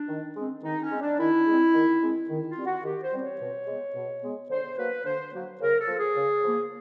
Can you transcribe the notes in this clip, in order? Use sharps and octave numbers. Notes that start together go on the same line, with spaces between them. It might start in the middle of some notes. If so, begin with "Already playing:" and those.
Already playing: D4
D#3
G#3 C4
D#3 D#4
C#4
G#3 C4
D4
D#3 E4
G#3 C4
D#3
G#3 C4
D#3
F4
G3 C4
F#4
D#3 G4
C5
G3 C4
C#5
B2
G#3 B3
B2
G#3 B3
D3 C5
F#3 A#3 B4
D3 C5
F#3 A#3
C#3 A#4
A4
F3 A#3
G#4
C#3
F3 A#3